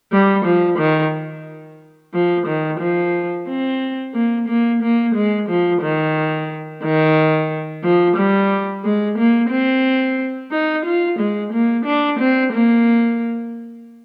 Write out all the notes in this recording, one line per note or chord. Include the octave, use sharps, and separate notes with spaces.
G3
F3
D#3
F3
D#3
F3
C4
A#3
A#3
A#3
G#3
F3
D#3
D#3
F3
G3
G#3
A#3
C4
D#4
F4
G#3
A#3
D4
C4
A#3